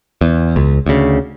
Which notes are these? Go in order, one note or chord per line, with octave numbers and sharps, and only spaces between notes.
E2
C#2
D2 C#3